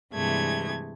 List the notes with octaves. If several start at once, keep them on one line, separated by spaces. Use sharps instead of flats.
G2 C3 E3 G#3 A3 G#6